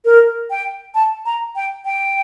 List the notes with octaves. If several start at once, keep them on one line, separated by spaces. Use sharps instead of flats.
A#4
G5
A5
A#5
G5
G5